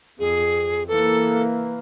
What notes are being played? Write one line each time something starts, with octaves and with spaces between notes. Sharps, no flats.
F2 G#4
E3 A#3 A4